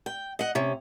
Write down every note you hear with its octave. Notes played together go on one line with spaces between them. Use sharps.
G5
D#5 F#5
C3 C#4